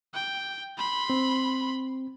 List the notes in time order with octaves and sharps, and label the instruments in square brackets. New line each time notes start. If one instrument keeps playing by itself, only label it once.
[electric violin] G5
B5 C6
[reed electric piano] C4